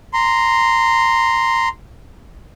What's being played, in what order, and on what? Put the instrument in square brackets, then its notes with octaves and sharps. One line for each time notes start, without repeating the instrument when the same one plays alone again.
[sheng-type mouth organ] A#5 C6